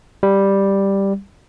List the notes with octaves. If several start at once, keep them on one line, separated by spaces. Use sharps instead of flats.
G3